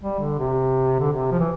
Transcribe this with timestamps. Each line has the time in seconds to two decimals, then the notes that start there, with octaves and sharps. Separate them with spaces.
0.02 G3
0.19 D3
0.39 C3
1.00 D3
1.12 C3
1.31 F3
1.40 E3